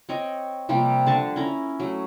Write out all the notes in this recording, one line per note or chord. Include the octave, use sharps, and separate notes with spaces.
C4 C#5 D#5
C3 F3 G3 A#3
D3 A5 C#6
C#4 E4 A#5
F#3 A3